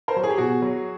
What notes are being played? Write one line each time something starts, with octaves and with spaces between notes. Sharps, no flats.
A#4 C5
F#3
G#4
G4
B2 F#4 G#4
F#3